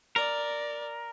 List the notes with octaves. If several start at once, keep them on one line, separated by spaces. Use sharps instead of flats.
A#4 D5